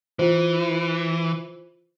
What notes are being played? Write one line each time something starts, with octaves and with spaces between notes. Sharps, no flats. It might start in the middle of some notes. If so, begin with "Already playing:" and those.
E3 F4 C5